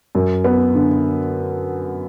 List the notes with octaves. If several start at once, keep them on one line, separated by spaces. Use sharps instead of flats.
F#2
B3
D3